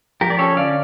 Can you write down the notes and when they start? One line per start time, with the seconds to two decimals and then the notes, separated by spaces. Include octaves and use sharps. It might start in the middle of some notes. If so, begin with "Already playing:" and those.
0.21 F3 G4 A#4
0.30 D5
0.39 C#4 A4 C#5
0.56 D3 D5 F5